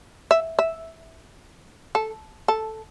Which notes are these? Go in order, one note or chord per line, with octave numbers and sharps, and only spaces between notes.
E5
E5
A4
A4